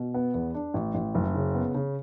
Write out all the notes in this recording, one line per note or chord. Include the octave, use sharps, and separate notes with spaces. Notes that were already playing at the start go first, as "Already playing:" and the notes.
Already playing: B2
B3
E2
D4
A1
A1
F#1
C#3
B3
C#3